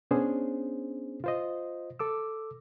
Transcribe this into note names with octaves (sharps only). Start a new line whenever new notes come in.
B3 C#4 D4 G#4 C5
F4 C5 D#5
A4 D6 E6